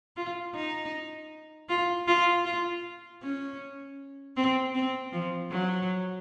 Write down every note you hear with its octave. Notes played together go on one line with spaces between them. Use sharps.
F4
D#4
F4
F4
F4
C#4
C4
C4
F3
F#3